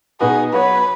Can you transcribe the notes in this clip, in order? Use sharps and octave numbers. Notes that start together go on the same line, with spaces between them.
B2 B3 D#4 F#4 G#4 B4
F#3 B3 F#4 B4 C#5